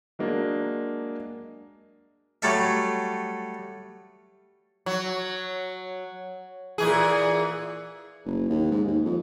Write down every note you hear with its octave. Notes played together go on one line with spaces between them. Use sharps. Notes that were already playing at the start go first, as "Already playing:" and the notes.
F#3 G#3 A#3 D4
F#3 G3 A3 E5
F#3
A#2 E3 G#4
F#1
D#2
G#2
D#2
F2